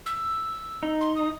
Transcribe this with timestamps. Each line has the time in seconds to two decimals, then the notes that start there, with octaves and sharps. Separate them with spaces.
0.06 E6
0.83 D#4
1.01 C6
1.16 D#6